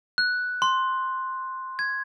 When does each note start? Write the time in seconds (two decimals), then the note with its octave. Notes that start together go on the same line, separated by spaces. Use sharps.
0.18 F#6
0.62 C6
1.79 G#6